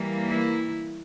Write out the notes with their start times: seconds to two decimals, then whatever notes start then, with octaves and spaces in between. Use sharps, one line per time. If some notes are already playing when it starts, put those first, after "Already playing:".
Already playing: E3 G3 A#3
0.28 E4